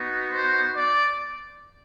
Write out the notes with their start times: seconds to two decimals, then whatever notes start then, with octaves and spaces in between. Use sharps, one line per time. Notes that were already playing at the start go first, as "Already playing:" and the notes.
Already playing: B3 D#4 F#4
0.31 C5
0.74 D5